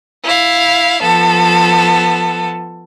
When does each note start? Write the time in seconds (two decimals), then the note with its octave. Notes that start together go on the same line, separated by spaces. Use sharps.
0.25 E4 F5
1.02 F3 B3 A4